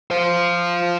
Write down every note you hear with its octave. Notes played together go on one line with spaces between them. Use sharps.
F4 C5